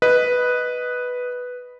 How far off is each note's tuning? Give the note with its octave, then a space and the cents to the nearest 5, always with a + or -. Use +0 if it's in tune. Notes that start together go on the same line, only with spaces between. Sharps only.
B4 +0 D#5 +0